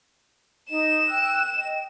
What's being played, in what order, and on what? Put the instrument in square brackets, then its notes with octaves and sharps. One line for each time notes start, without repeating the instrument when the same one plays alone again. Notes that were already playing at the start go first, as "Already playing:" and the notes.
[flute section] D#4 D#5 [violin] E7
[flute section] G5 E6 F#6
D#5 G5